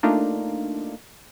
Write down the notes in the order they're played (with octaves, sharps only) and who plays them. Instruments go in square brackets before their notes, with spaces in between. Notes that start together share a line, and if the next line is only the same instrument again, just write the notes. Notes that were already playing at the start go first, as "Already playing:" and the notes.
[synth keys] A3 A#3 D4 D#4 F4